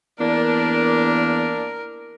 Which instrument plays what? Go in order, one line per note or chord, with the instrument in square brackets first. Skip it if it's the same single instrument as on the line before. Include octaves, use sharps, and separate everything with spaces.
[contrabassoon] E2 [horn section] A#3 D4 [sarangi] A#4